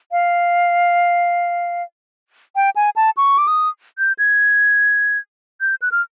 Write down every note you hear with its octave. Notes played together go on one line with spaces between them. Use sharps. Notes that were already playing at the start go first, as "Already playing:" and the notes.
F5
G5
G#5
A5
C#6
D6
D#6
G6
G#6
G6
F#6
F6